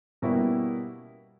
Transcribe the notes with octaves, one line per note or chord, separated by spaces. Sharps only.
B2 G3 A#3 C#4 E4